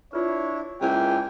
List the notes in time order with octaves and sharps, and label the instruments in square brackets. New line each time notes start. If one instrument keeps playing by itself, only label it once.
[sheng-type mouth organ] D4 E4 [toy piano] F4 G#4 B4 [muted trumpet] C#5
[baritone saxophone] C#2 [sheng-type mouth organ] A#3 E4 G#5 [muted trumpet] G5